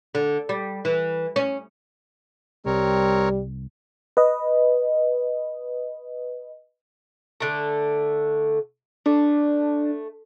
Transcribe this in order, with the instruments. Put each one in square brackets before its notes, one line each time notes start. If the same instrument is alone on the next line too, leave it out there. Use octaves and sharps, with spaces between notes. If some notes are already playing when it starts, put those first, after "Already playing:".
[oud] D3
G3
E3
C#4
[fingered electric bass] C2 [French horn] G3 [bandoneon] C4 A#4 C#5
[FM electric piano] B4 D#5
[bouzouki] D3 A3
[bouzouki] A3 [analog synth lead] D4